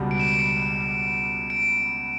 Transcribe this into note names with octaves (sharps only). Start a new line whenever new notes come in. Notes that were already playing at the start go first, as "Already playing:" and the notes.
Already playing: C#2 B2 G3 B3
D7
E7
D7
C#7
D7